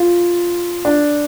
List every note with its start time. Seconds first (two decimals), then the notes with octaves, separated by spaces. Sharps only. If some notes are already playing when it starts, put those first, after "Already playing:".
Already playing: F4
0.85 D4